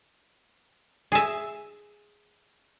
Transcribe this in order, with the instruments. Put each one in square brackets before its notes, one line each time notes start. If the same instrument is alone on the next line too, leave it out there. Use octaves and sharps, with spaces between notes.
[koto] G#4 E5